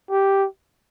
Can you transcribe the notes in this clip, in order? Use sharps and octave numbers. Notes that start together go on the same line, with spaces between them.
G4